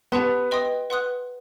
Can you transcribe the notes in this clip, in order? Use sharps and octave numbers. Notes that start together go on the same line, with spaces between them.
B3 G4 B4 F#5 A5 C6
B4 D#5 G5 C6 D#6
B4 F#5 C6 D#6 F#6